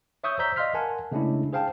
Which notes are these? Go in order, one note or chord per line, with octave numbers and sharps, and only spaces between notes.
C#5 E5 C#6 D#6 E6 G6
C5 D5 A#5 E6 G6 B6
D5 D#5 F5 C6 F6 B6
A#4 F#5 G#5 A5
C#3 G#3 A3 C#4 D4 E4
G#4 C5 F5 G5 A5